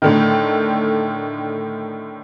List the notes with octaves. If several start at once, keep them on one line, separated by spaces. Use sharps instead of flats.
A2 D3 D#3